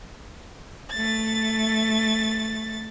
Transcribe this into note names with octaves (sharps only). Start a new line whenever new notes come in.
A3 A6